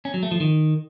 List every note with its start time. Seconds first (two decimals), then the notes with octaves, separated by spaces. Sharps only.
0.05 C#4
0.14 F#3
0.23 A3
0.31 F3
0.40 D#3